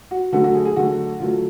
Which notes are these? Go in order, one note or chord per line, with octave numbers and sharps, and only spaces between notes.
F#4
D3 F#3 A3 F#4
F#4
G#4
G#4
D3 F#3 A3 F#4
D3 F#3 A3 F4